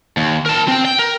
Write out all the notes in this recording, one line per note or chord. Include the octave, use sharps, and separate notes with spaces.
D#2
A#4 A5
C4 G5
G5
A#4